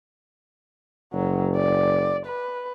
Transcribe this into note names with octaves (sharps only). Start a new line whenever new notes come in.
F#1 F#3
D5
B4